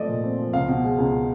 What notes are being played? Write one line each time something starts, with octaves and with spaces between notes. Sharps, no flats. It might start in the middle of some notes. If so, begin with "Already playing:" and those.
Already playing: F3 A3 C4 D5 D#5
A#2
C4
F3
C#2 F5
B2
G#3
C#2